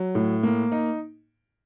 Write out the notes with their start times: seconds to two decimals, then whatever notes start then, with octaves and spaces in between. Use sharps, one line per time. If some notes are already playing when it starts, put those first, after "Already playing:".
Already playing: F#3
0.15 A2
0.43 A#3
0.72 D#4